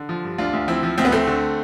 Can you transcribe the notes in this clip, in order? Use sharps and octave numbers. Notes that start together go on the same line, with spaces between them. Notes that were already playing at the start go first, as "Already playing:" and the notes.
Already playing: D3
F3
G2
D2 D4 F4
D2
F3 C4 E4
F3
D2 C4
B3
D2 A3 C4
D3